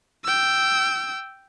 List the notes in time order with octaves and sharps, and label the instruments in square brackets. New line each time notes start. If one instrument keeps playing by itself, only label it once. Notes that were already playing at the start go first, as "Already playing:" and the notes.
[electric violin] G5 E6